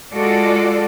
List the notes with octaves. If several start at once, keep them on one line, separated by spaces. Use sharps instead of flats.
G#3 F4 F#4 A4 D5